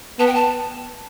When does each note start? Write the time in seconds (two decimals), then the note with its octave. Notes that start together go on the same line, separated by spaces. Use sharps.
0.19 B3 A5
0.27 G5
0.35 A5